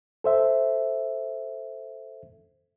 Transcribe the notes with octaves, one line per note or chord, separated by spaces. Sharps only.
A4 C5 E5